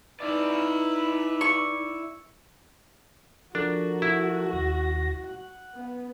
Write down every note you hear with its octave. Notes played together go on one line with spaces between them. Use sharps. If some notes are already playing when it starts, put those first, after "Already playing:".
D#4 E4 B4 D5
C#6
F3 D4 F#4 A4 A#4
E4
D#2 A#6
F#5
B3